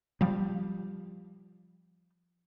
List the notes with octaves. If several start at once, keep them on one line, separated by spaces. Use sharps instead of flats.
F3 G3